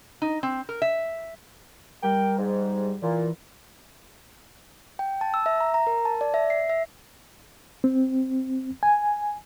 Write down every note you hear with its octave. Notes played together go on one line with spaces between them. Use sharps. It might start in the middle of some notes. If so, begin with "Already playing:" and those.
D#4
C4
A#4
E5
G3 A#4 G5
G#2
A#2 E3
G5
A5
E6
E5
A#5
A#5
A#4
A5
D5
E5
C7
E5
C4
G#5